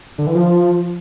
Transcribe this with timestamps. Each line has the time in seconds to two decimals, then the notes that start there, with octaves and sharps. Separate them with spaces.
0.18 D3
0.27 E3
0.35 F3